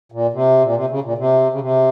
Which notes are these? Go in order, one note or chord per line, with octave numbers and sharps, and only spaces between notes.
A#2
C3
A#2
C3
C#3
A#2
C3
C#3
C3